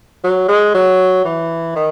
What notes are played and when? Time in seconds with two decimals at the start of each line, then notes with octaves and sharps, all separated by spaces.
0.24 F#3
0.48 G#3
0.74 F#3
1.25 E3
1.76 D#3